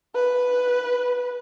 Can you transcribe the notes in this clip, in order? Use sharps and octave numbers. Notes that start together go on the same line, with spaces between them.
B4